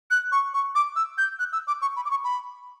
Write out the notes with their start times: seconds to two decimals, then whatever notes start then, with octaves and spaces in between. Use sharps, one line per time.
0.11 F#6
0.32 C#6
0.54 C#6
0.75 D6
0.96 E6
1.18 G6
1.39 F#6
1.53 E6
1.68 D6
1.82 C#6
1.96 B5
2.05 D6
2.11 C#6
2.24 B5